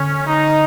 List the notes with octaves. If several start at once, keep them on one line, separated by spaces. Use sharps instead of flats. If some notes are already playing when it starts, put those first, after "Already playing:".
Already playing: D3 C#4
D#4